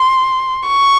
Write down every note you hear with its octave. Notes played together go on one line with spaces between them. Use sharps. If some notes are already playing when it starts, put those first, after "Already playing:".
Already playing: C6
C#6